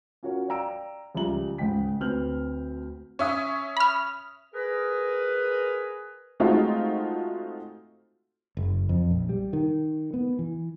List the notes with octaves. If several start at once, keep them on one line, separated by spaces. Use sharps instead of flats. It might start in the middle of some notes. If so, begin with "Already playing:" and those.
C#4 F4 F#4 A#4 C#5
D5 F5 G5 A#5 E6 D7
C#2 F3 G3 E5 A#5 F#7
C#2 G#2 D#5 G5 B6
D2 C4 B4 F6 G6 F#7
C#4 E5 D#6
B5 F6
G#4 A#4 B4
G#3 A3 C4 D#4 F4 F#4
F#1
F2
A#1
G3
D#3
B3
E3